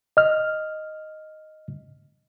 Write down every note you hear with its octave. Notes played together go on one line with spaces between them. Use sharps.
D#5 F6